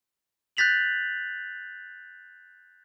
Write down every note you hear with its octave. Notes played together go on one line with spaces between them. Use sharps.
F#6 G6 A6 B6 F7 F#7